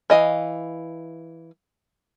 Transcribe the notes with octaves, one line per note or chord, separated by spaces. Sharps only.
E3 D#5 F5